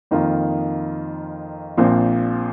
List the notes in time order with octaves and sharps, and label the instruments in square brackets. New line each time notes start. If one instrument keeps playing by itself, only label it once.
[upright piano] F2 D#3 A#3 F4
A#1 A#2 F3 C4 F4